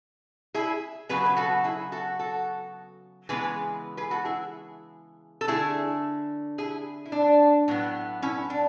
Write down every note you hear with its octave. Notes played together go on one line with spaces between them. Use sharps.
E4 G#4
C#3 F#3 B3 G#4 B4
B4
F#4 A4
E4 G#4
F#4 A4
F#4 A4
C#3 E3 G#3 B3 G#4 B4
G#4 B4
F#4 A4
E4 G#4
A4
D3 A3 E4 G#4
E4 G#4
E4
D4
A2 F#3 B3
C#4 E4
D4